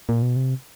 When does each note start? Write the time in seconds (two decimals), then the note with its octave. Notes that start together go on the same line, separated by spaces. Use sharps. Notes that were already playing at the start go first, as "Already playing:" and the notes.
0.09 A#2
0.22 B2
0.36 C3